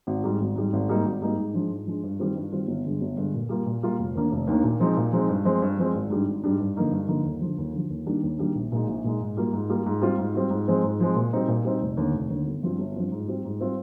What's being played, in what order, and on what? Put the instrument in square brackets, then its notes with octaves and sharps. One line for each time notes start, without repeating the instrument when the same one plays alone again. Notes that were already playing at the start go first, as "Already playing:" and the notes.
[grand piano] G#1
G#2 G3
G#1
G#2 G3
G#1
G#2 G3 A#3 D#4
G#1
G#2 G3 A#3 D#4
G#2
F3 G#3 D4
G#2
F3 G#3 D4
G2
D#3 G3 C4 F4
G2
D#3 G3 C4 F4
G1
G2 D3 G#3
G1
G2 D3 G#3
A#2
G3 A#3 F4
A#2
G3 A#3 F4
F1
D#2 D#3 A#3 D4
F1
D#2 D#3 A#3 D4
A#2
F3 G#3 C4 D#4
A#2
F3 G#3 C4 D#4
G2
F3 G#3 C4
G2
F3 G#3 C4
G#1
G#2 G3 D4
G#1
G#2 G3 D4
G2
D3 F3 A#3 D#4
G2
D3 F3 A#3 D#4
D#2
D3 F3
D#2
D3 F3
D#2
D#3 G3 A#3 D4
D#2
D#3 G3 A#3 D4
A#1
A#2 G#3 D#4
A#1
A#2 G#3 D#4
G#2
G3 A#3 F4
G#2
G3 A#3 F4
G#2
G3 C4 F4
G#2
G3 C4 F4
G#2
F3 G#3 C4
G#2
F3 G#3 C4
A#2
G3 C4 D#4
A#2
G3 C4 D#4
F1
D#2 D3
F1
D#2 D3
G1
G2 F3 C4 F4
G1
G2 F3 C4 F4
G#2
G3 C4 F4
G#2
G3 C4 F4